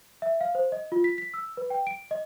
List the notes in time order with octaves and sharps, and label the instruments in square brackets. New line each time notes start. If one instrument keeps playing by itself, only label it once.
[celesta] E5
F5
C5
D#5
F4
B6
B6
E6
B4
G5
D7
D#5